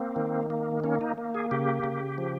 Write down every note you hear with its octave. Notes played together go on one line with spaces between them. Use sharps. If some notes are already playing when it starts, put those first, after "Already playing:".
Already playing: A#3 C4
D#3
A#3
A#3 C#4
D#4
A#3
G#4
C#3 G4
C#3
F3